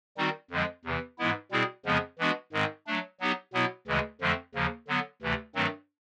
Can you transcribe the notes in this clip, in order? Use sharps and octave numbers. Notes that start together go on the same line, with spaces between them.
D#3 G3 C4 D#4 F#4
F2 D3 F3 G#3
E2 C3 E3
G#2 E3 G#3 B3 E4
B2 G3 C4 E4 G#4
F2 C#3 F3 G#3 B3
E3 G#3 B3 D4 F#4
G#2 D#3 G#3 C4
F#3 A3 D4
F#3 B3 D#4 G4
B2 F#3 B3 E4
D2 C#3 E3 G#3
F2 D3 F3 A3 C4
D#2 C#3 F3 A#3
D3 F#3 B3
D2 C3 E3 A3
G2 D#3 F#3 A3 C4